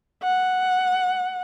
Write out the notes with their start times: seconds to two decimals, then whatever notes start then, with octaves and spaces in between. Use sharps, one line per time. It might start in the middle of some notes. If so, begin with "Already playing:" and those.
0.23 F#5